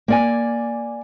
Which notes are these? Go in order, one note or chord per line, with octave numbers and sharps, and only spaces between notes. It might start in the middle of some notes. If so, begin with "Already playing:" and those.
A#3 D5 G#5